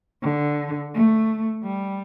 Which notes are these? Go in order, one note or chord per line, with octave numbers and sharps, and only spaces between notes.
D3
A3
G3